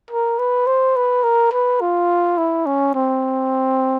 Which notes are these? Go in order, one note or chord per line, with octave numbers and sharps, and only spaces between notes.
A#4
B4
C5
B4
A#4
B4
F4
E4
C#4
C4